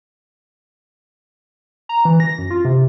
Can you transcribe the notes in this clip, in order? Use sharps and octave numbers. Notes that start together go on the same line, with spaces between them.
A#5
E3
A#6
F#2
F4
C3